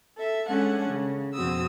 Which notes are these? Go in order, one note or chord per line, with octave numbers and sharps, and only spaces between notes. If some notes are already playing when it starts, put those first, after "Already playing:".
A4 E5
G#3 C#4 D4 A4 F#5
C#3
F2 B2 C4 F#4 D#6 E6